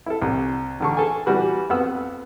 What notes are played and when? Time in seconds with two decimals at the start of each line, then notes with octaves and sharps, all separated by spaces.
0.06 E4 A4
0.22 C2
0.80 A1 D3 C#6
0.97 G#4 A4 G#5
1.26 E3 G3 F#4 B4
1.70 F2 B3 F#5 E6